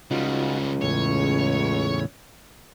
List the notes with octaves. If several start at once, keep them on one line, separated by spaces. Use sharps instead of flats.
C#2 C#3 G3 D#4 F4 F#4
E2 A2 C#3 C#5